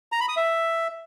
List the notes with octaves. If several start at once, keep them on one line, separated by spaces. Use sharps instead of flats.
A#5
B5
D#6
E5